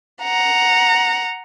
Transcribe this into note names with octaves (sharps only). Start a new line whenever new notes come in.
F#5 A#5